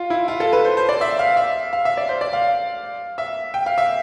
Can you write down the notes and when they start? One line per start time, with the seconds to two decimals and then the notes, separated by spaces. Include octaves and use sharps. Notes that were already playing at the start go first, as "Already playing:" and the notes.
Already playing: F4
0.10 E4
0.28 F4
0.40 A4
0.53 B4
0.65 C5
0.77 C5
0.89 D5
1.01 E5
1.19 F5
1.37 E5
1.73 F5
1.85 E5
1.97 D5
2.09 C5
2.21 D5
2.33 F5
3.18 E5
3.54 G5
3.66 F5
3.78 E5